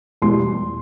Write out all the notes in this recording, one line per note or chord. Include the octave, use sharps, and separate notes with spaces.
E2 B2 G3 C6